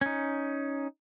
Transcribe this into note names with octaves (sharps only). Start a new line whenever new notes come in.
C#4 D#4